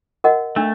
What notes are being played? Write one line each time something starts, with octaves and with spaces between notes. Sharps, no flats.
F#4 A#4 D#5 F#5
A3 D4